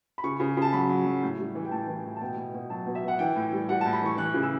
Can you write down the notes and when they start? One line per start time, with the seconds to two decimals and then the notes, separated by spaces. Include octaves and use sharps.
0.18 B5
0.24 C#3 C#6
0.40 C#3
0.57 C#3 A5
0.73 F#3 B5
0.89 F#3
1.06 F#3
1.23 A2
1.39 G3
1.55 E3
1.65 G5
1.71 A2 A5
1.88 E3
2.05 A2
2.16 A5
2.21 B2 G5
2.37 B2
2.54 B2
2.70 F#3 A5
2.87 B2
2.95 E5
3.03 B2 F#5
3.19 E3 G5
3.36 A2
3.53 G3
3.69 G3 F#5
3.81 A5
3.85 A2
3.93 B5
4.02 E3 C#6
4.18 E3 F#6
4.34 C#3
4.43 E6